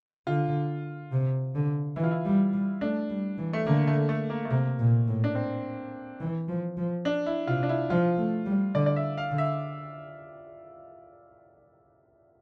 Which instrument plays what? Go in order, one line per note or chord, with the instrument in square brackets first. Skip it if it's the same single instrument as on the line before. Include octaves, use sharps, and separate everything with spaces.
[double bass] D3 [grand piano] F4
[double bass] C3
D3
[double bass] E3 [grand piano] E4
[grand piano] F4
E4
[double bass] G3
G3
[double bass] A3 [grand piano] D4
[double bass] G3
E3
[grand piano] A3
[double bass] D3 [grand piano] A#3
[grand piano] A3
A3
A#3
A3
[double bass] C3 [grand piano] A#3
[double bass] A#2
A2
[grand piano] D4
C4
[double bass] E3
F3
F3
[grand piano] D4
E4
[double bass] C3 [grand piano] F4
[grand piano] D4
E4
[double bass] F3 [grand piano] F4
[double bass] A3
G3
[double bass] D3 [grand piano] D5
[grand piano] D5
E5
F5
[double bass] D3
[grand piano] E5